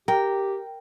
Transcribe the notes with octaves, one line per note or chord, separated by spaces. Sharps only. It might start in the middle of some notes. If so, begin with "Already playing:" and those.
G4 A#4 G5